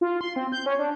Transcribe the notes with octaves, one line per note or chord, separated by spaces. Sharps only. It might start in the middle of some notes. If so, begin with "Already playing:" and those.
F4
C6
C4
G6
C#4
D4